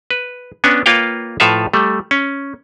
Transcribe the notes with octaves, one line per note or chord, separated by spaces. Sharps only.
B4
B3 C#4 D4 G#5
A#3 F4 B4 C#5 F5 G5
A2 F3 A4 B4 E5 F5
G3 A3
C#4